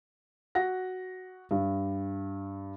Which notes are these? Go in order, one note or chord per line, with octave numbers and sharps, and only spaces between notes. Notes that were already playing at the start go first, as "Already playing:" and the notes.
F#4 F#5 A#6
G2